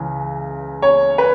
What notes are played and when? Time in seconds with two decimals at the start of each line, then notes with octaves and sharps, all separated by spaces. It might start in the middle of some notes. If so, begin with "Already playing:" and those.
Already playing: C#2 C#3 E3
0.82 C#5
1.18 B4